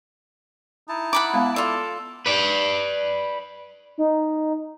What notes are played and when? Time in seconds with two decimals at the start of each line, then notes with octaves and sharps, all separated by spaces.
0.89 D#4 E4 A5
1.13 F#5 B5 D6
1.33 G#3 B3 F5
1.56 F4 A4 D5 D6
2.26 B4 D5
3.98 D#4